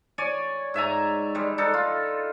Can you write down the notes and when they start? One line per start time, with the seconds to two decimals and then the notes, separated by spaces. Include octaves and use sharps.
0.18 C#5 D5 G#5
0.74 G#2 E5 G#5 A#5
1.35 G3 G#3
1.58 D4 D#4 A4
1.74 F4